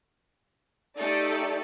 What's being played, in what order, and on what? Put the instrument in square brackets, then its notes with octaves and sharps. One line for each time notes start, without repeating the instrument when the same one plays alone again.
[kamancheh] A3 G4 [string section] D#4 A4 D5